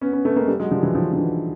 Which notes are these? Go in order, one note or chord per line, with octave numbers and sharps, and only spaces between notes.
B3 C#4
B3 C#4
A3 B3
G#3 A#3
G3 A3
F#3 G#3
F3 G3
E3 F#3
D#3 F3
F3
D3 E3